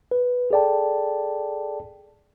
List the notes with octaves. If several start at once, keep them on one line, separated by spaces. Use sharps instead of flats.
B4
G#4 A4 D5 G5 A5